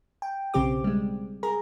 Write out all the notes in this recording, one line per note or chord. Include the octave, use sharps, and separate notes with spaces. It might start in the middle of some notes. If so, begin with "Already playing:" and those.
G5
B1 C#3 C4 G4 D6
G3 G#3
G#4 A#4 A#5